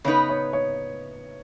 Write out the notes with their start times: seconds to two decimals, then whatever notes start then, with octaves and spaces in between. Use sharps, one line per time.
0.05 C#3 B3 D#4 B4 C#5
0.29 C#5
0.53 C#5